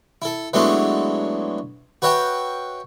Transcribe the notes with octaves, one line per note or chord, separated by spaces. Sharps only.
E4 A4
E3 F#3 G#3 A3 B3 D4
F#4 B4 C#5 E5 G5